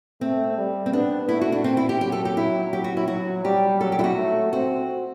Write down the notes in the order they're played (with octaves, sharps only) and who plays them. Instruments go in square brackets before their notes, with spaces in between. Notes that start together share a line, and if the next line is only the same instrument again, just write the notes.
[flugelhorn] A3 [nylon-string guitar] C4
[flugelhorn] G3
[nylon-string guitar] C4
[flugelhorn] B3 [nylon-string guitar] D4
[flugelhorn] A3 [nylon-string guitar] E4
[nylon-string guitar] F#4
D4
C4
E4
G4
[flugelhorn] F#3 [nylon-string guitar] G4
[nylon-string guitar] A4
G4
E4
[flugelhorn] F#3 [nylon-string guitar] G4
[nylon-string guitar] F#4
E4
[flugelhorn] F#3 [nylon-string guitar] F#4
[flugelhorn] G3 [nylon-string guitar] G4
[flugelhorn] F#3 [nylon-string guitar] A4
[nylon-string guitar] G4
E4
F#4
[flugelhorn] A3
[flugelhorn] C4 [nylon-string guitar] F#4